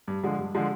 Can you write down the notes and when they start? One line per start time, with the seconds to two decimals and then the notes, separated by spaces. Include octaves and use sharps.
0.08 G2
0.23 D3 F3 G#3
0.39 G2
0.55 D3 F3 G#3